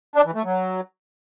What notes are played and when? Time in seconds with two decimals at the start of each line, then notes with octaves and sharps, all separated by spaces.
0.16 D4
0.25 E3
0.35 A3
0.44 F#3